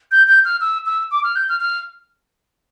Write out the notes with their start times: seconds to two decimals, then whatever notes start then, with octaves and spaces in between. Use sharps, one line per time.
0.12 G6
0.28 G6
0.45 F6
0.61 E6
0.86 E6
1.11 D6
1.24 F6
1.36 G6
1.49 F6
1.61 F6